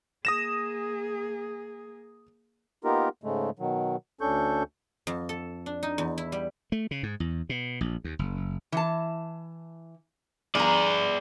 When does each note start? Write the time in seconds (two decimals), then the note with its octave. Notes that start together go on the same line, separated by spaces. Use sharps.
0.25 A#3 G#4 D#6 A#6 E7
2.84 A#3 B3 D#4 F4 G4 A#4
3.24 G#2 C#3 G#3 A3
3.59 B2 D#3 F#3
4.21 D2 C#4 D4 A4 C#6 G6
5.07 F2
5.29 A4
5.66 D4
5.83 D#4
5.98 E2
6.18 E4
6.32 G3
6.72 A3
6.91 C#3
7.03 G#2
7.20 E2
7.49 B2
7.81 A#1
8.04 D#2
8.19 F#1
8.72 E3 A5
10.55 G2 G#4 D5 A#5